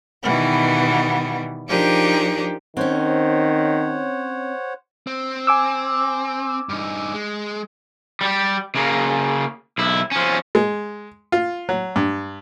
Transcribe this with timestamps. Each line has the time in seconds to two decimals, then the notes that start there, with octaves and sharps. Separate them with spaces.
0.22 B2 D#3 E3 G3 B3
1.68 F3 D4 D#4 G4 G#4 A#4
2.77 D#3 C4 C#4 C5 C#5 F#5
5.07 C4
5.47 G#5 D6 E6
6.69 G2 D#4
7.14 G#3
8.21 G3 G4
8.75 C#3 A#3
9.78 B1 E4
10.11 F3 C#4
10.55 G#3
11.32 F4
11.69 F#3
11.96 G2